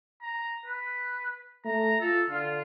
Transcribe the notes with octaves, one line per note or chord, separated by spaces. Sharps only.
A#5
B4
A3 A#5
F4 A4
D3 F4